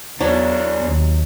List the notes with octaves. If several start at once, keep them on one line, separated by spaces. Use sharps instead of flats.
E2 F#3 B3 D4
D#2